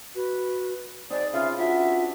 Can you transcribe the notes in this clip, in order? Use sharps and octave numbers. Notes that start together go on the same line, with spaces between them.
F#4 B4
C4 D#4 G#4 C5 D5
C#3 F4 G#4 B4 E5
D4 F4 F#4 E5